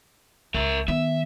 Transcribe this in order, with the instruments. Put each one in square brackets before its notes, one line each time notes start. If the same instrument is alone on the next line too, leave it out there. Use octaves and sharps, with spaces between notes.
[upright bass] C#2 [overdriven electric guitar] A#4 E5
[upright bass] D#3 B3 [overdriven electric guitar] E5